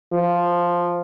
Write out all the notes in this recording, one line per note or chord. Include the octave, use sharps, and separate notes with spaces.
F3